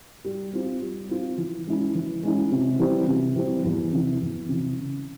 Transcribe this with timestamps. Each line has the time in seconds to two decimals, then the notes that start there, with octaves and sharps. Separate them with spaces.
0.25 G3
0.53 C4 F4
0.82 G3
1.09 C4 F4
1.38 E3
1.67 G#3 C#4 E4
1.95 E3
2.23 G#3 C#4 E4
2.52 C3
2.79 E3 G3 C4
3.08 C3
3.36 E3 G3 C4
3.64 E2
3.93 C3 E3
4.21 E2
4.49 C3 E3
4.77 C#3